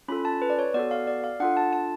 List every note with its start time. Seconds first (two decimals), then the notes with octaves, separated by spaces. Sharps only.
0.08 C#4 F4 A4 B5
0.25 A5
0.42 B4
0.50 D5
0.59 C#5
0.74 B3 F#4 A4 D5
0.91 F5
1.07 D5
1.24 F5
1.40 D4 F4 A4 F#5
1.57 A5
1.73 A5